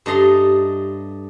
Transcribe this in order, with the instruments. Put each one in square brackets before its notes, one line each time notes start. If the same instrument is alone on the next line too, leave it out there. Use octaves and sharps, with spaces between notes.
[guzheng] G2 A3 D#5 A#5 C6